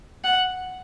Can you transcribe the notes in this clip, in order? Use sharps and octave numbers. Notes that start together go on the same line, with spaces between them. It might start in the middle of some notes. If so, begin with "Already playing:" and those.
F#5